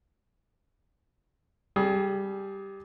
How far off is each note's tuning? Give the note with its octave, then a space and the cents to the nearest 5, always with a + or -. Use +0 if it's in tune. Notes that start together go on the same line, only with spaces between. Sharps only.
G3 +0 G#4 +25